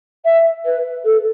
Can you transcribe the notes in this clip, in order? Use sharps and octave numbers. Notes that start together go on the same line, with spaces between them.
E5
B4
A4